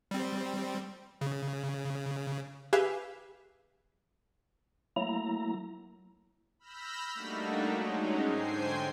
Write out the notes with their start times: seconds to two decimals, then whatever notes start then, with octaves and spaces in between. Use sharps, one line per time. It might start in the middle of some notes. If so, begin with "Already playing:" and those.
0.11 G3 C4
1.21 C#3
2.73 G4 G#4 B4 E5 F5 G#5
4.96 F#3 A3 A#3 E4 A#5
6.59 B5 E6 F6 G6 A#6 B6
7.13 G3 A3 A#3 D4 D#4 F#4
7.66 F#3 G#3 C#4 D#4
8.25 G#2 D3 C5 G5 G#5 C7